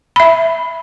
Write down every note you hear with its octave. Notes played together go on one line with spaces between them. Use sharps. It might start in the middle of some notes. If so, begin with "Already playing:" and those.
E5 B5